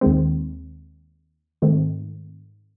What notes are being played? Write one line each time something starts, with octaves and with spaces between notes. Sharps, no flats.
D#2 D#3 G#3 C4
G#2 D#3 A3 C4